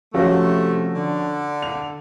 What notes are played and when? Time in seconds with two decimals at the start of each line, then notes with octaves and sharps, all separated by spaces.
0.14 C3 F3 A3 C#4 F#4
0.95 D3
1.62 F7